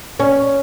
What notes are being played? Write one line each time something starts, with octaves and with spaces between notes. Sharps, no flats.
C#4